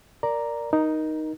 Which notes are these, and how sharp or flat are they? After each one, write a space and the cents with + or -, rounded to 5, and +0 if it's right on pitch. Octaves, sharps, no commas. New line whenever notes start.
A#4 +0 D5 +0 A#5 +0
D#4 +0 A#4 +20